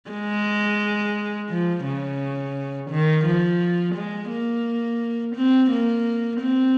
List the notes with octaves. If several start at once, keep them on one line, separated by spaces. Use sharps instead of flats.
G#3
F3
C#3
D#3
F3
G#3
A#3
C4
A#3
C4